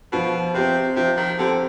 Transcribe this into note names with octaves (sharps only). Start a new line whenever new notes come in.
B2 F3
C3 C4 G4 C5
C3 F3
D#3
D3 C4 G4 C5